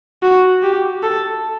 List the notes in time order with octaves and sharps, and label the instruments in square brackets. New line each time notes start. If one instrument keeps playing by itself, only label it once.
[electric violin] F#4
G4
A4